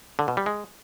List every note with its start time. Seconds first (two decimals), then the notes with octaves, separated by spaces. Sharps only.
0.19 D3
0.28 B2
0.37 G3
0.46 G#3